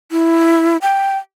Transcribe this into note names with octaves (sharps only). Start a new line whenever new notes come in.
E4
G5